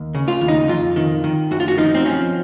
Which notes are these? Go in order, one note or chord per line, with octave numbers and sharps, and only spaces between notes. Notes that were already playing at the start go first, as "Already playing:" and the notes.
Already playing: D#2
C#3
F4
D#2
D#4
F2 F4
D#3
D#3
F#2 F#4
F4
F#4
F3 D#4
C4
F3 C#4